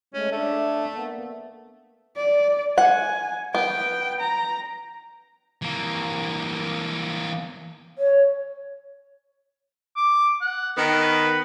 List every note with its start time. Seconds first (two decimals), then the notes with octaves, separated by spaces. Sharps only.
0.14 G#3 A3 C#4
0.32 A3 D4 E5
0.93 A#3 B3
2.16 D5
2.78 F#5 G#5
3.55 B3 G5
4.20 A#5
5.62 E3 A#3
7.98 C#5
9.97 D6
10.41 F#5
10.77 D#3 B3 A#4
11.01 B4